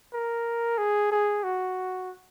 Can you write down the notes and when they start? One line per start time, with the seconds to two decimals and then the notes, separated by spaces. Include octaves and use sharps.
0.13 A#4
0.78 G#4
1.11 G#4
1.43 F#4